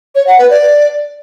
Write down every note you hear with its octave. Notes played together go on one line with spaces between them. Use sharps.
C#5
F#5
B4
D5